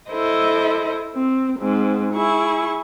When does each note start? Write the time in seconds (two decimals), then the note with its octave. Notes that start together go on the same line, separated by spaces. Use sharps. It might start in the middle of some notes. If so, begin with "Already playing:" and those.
0.11 E4 A4 C5 D#5
1.15 C4
1.58 G#2 C4
2.12 E4 G#4 C#6